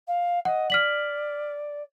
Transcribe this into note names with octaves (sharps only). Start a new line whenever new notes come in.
F5
D#5 F#5
D5 F6 B6 F#7